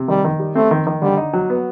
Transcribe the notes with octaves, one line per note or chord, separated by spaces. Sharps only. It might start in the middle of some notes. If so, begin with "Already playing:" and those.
Already playing: C3
D#3 G3
D#3
G3
A3 C4
D#3
D#3
D3 G3
D#4
F#3
B3